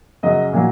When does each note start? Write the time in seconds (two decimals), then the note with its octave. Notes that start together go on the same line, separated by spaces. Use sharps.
0.23 F#2 C#3 F#3 D#5
0.53 A#2 F#3